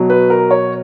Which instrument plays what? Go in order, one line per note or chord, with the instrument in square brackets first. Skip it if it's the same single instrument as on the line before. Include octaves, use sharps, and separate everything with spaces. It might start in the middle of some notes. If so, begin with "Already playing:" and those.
Already playing: [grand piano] B2 F#3
B4
A#4
C#5